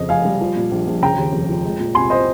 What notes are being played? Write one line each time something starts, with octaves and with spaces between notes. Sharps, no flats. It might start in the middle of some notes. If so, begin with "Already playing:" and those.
Already playing: F2 C#3 D#5
F1 F5 G#5
G3
F3
A#2
A#1
A#1
C#3 G5 A#5
D#2
F1
F3
G#3
A#2
C2 G#5 C6
C5 D#5